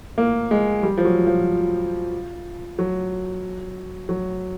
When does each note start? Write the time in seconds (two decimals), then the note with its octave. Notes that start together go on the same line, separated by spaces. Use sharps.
0.18 A#3
0.51 G#3
0.83 G3
0.97 F3
1.05 F#3
1.27 F3
2.79 F#3
4.09 F#3